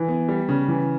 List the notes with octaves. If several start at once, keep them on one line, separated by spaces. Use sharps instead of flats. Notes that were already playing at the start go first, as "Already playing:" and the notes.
Already playing: E3
B3
G3
C#3
E3